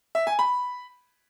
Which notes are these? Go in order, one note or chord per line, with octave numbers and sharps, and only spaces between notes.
E5
G#5
B5